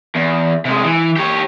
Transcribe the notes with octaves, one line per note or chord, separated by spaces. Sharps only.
E2
C3 G#3
E3
G4 C#5